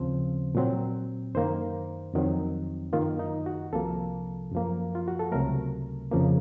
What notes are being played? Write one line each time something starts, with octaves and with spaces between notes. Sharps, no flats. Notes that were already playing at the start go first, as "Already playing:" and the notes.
Already playing: D#2 C#3 F3 C4 C5
A#2 F#3 C4
F#2 D#3 A#3 C5
F2 D#3 F#3 C4
F#2 D#3 A#3 F4
D#4
F#4
C2 C3 F3 A#3 A4
F#2 F3 A#3
F4
F#4
A4
C#2 C3 F#3 A3 A#4
F2 C#3 F3 A#3